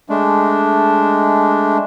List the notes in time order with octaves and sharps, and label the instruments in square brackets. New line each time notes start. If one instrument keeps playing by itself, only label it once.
[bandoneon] G#3 A3 D4